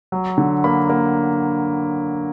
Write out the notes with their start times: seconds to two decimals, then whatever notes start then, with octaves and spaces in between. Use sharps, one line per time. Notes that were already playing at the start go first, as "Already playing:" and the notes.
0.12 F#3
0.38 D3
0.64 A#3 B5
0.89 A#3